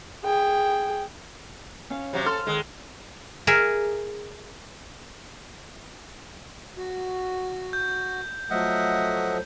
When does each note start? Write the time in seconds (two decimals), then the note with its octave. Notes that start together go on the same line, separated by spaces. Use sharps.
0.24 G#4 G5
1.90 C#4 F5
2.13 C3 F#3
2.26 A4 C6 F6
2.47 D#3 G#3 F#6
3.47 G#4 A#4 E5
6.78 F#4
7.73 G6
8.51 F3 F#3 A3 D#5 E5 F#5